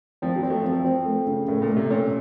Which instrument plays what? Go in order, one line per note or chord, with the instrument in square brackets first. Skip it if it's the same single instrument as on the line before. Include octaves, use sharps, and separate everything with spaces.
[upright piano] F3 [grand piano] C4
[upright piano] F#3
[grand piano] C4
[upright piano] A3
[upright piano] F3 [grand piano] C4
[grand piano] C4
A3
C#3
[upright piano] A2 [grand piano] A3
[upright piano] A#2
[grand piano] A3
[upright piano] C3
[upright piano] A#2 [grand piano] C#4